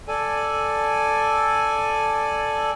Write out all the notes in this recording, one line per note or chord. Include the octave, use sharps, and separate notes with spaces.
A4 D5 G#5